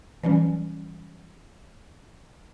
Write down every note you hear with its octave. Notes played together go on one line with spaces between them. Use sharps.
E3 F#3 G3 C#4